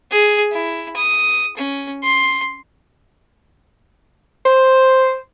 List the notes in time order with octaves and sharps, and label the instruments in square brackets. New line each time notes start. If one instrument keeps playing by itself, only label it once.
[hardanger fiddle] G#4
E4
D#6
C#4
C6
[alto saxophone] C5